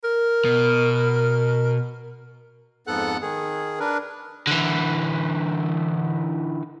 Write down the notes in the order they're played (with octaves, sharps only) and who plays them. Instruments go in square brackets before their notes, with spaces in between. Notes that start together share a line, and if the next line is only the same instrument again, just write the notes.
[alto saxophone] A#4
[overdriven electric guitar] B2
[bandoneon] F2 G#2 B3 A4 F#5 F#6
D#3 G#4
D4 A#4 B4
[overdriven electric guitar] D3 E3